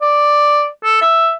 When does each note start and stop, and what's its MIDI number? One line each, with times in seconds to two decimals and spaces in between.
0.02 0.67 74
0.84 0.98 69
1.02 1.33 76